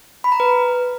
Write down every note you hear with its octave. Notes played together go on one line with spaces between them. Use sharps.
B5
A#5
B4